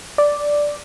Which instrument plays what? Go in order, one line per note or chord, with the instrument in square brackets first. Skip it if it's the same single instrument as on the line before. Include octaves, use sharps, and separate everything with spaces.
[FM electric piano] D5